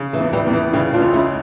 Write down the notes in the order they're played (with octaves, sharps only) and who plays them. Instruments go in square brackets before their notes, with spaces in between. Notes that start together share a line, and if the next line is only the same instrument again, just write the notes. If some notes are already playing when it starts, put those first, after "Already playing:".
Already playing: [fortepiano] C#3
[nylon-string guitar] E3
[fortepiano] E2
[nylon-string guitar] E3 G3
[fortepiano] E2
[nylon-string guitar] E3
[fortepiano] C#3 [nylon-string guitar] E3 G3
[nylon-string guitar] D4 F4
[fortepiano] C#2
[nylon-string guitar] C#4 E4